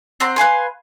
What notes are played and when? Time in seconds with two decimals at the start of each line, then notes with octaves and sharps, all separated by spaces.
0.20 C4 F#5 A#5 C6
0.36 B4 F5 G#5 C6